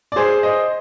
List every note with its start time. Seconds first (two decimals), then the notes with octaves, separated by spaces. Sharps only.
0.12 D5
0.16 G#4 C5
0.43 C5 D#5